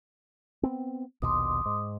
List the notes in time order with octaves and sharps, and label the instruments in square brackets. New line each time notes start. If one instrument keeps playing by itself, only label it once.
[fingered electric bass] B3 C4
[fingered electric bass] A#1 D#2 B2 [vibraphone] C6 D6 D#6
[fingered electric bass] G#2